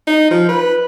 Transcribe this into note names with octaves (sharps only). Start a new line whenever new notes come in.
D#4
F3
B4